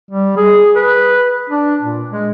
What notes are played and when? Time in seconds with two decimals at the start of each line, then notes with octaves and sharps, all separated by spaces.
0.11 G3
0.37 G#4
0.76 B4
1.49 D4
1.82 A#2
2.10 G#3